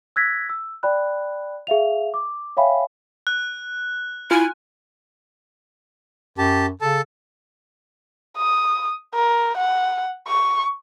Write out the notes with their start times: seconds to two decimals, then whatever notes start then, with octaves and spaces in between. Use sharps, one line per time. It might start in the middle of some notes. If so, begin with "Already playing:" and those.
0.16 E6 F#6 G#6 A#6 B6
0.49 E6
0.83 D5 G5 B5 F#6
1.67 G#4 E5 F5 F7
2.14 D6
2.57 C#5 E5 F5 G5 G#5 B5
3.27 F#6
4.31 E4 F4 G#5
6.38 F#2 G4 A5
6.81 C#3 A4 A5
8.37 D#6
9.14 A#4
9.57 F#5
10.27 C#6